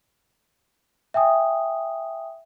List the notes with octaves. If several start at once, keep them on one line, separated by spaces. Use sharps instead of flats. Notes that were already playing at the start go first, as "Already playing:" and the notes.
E5 G5 G#5 D#6